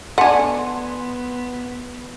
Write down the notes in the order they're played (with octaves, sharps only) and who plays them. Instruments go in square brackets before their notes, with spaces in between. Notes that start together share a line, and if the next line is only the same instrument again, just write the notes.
[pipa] A3 G#5 [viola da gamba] B3 [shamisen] D4 F#5 [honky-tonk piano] C6